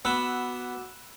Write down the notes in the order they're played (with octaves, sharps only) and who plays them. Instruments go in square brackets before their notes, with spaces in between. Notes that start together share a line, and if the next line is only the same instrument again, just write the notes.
[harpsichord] B3 [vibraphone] F#4 F#5 D6 [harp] B5 [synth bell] E6 F#6 E7